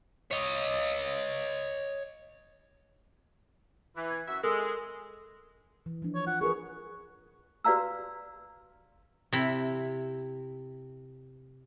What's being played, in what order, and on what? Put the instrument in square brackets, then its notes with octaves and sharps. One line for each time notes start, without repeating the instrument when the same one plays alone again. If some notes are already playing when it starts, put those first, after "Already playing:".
[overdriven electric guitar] C#5 D#5
[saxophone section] E3
[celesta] G#6
[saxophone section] F#2 F#4 E5
[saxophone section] G#3 [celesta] A4 A#4 E6
[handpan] E3
F3 D4
[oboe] C#5
[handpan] F4 [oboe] F#5
[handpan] G#4 A#4 B4 [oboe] C#6
[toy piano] F#4 B4 D5 F5 A#5 E6
[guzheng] C3 E4